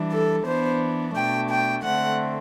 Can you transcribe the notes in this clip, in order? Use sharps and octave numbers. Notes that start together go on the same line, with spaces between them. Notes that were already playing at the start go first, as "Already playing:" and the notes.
Already playing: E3 G3 D4
A4
E3 B3 D4 C5
B2 A3 D4 G5
G5
D3 A3 C4 F#5